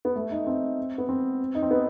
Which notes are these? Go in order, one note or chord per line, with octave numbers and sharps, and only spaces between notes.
B3
A3
D#4
C4
B3
C4
D#4
C4
B3